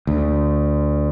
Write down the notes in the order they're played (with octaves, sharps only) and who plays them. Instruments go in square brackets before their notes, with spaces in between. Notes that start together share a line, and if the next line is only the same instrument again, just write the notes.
[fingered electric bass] D2